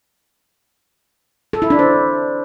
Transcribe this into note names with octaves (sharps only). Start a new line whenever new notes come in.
A4
E4
D4
C5